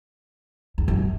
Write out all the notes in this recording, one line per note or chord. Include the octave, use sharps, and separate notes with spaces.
E2
F#2